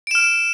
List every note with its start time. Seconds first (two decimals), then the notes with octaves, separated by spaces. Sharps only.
0.07 D7
0.11 E7
0.15 F6